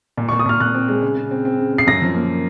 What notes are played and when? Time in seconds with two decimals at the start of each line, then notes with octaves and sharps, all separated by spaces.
0.17 A#2
0.29 C#6
0.31 A#2
0.39 D#6
0.46 A#2 F6
0.60 A#2 F#6
0.75 C4
0.88 G#3
1.02 C#3
1.16 C#3
1.31 C4
1.45 C4
1.59 C#3
1.74 C4 C7
1.87 F#2 A#6
2.02 F3
2.15 A#3